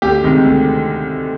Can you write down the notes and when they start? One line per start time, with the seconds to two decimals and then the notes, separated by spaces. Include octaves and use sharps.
0.02 D2 G4
0.23 C3 D#3 G#3
0.44 D2